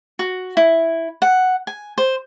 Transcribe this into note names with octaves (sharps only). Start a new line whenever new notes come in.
F#4
E4
F#5
G#5
C5